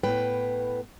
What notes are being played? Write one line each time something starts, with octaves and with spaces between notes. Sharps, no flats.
A2 B3 B4 G5